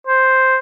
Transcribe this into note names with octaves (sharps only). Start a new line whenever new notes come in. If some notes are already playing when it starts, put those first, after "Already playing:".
C5